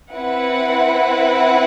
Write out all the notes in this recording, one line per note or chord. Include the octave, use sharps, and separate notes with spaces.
C4 E4 B4 F#5